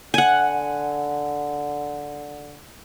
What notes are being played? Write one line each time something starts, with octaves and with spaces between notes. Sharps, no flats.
D3 F#5 G#5